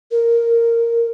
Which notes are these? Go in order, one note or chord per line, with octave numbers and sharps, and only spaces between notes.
A#4